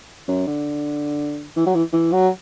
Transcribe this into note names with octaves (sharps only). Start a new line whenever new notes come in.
F#2
D3
E3
F#3
E3
E3
F#3